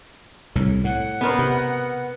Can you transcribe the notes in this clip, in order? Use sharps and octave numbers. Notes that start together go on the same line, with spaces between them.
C2 A2
A2 F#5
B3 A#4 C5
C3